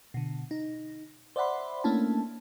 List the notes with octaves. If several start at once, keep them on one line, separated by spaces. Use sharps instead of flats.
B2 D3
D#4
C5 D5 E5 F#5 B5 C6
A3 A#3 C#4 D4 E4 A5